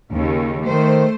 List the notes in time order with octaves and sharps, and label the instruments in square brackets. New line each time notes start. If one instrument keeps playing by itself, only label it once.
[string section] D#2 C#3
[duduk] D#3 [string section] A3 C5